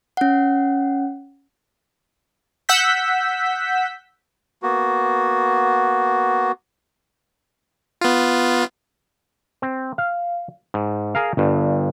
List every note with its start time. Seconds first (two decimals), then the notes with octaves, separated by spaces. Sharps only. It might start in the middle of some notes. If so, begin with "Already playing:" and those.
0.17 C#4 F#5
2.69 F#5 E6 G6 B6
4.63 A#3 B3 F#4
8.01 B3 F4
9.62 C4
9.98 F5
10.74 G#2
11.15 G#4 A#4 F5
11.37 G1 G2